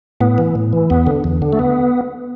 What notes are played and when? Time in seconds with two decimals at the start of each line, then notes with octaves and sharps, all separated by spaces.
0.21 A2 B3
0.38 E3
0.55 A2
0.73 E3
0.90 E2 B3
1.07 D3
1.24 E2
1.42 D3
1.53 A3
1.59 B3